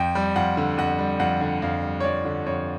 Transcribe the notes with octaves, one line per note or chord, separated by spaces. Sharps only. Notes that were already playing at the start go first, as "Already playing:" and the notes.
Already playing: F2 G5
G3
F2 F#5
D3
F2 F#5
G3
F2 F#5
D3
F2 F5
G3
C#5
F2 D5
D3
F2 C#5